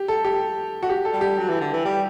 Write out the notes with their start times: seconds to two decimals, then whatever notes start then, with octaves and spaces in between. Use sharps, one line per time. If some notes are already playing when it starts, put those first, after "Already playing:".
Already playing: G4
0.08 A4
0.25 G4
0.83 F#4
0.89 G4
1.05 A4
1.13 G3
1.21 G4
1.38 F#3
1.49 E3
1.61 D3
1.73 E3
1.85 G3